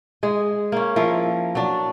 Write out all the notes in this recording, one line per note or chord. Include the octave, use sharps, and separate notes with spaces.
G#3 G#4
A#3 C#4
F3 E4 A#4
F#3 D4